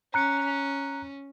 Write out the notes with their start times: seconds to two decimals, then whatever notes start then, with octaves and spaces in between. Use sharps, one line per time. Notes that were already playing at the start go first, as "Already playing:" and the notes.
0.14 C#4 A#5 F#6 C#7